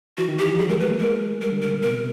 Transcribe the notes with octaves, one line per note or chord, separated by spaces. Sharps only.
E3 F#4
D#3
E3 G4
F3
F#3 G#4
G#3 A#4
A3 B4
A#3
G#3 A#4
G3 A#4
D3
C#3 A#4
A#2
B2 A#4
C3
B2